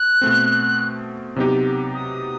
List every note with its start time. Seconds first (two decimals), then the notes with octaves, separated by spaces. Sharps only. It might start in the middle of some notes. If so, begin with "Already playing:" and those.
Already playing: F#6
0.21 B2 A3 C4
1.36 C3 F#3 B3 D#4 G4
1.94 D#6